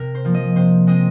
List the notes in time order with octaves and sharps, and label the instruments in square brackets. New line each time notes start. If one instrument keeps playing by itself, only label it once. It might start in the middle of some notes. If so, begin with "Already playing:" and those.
Already playing: [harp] C3 A#4
C5
F3 A#3
D#5
C3 C5
G#3 C4 D#5